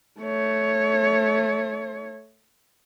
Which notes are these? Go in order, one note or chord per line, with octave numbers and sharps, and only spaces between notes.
A3 C#5